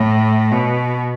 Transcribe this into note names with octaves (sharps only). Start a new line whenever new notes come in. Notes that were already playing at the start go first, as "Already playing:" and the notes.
Already playing: A2
B2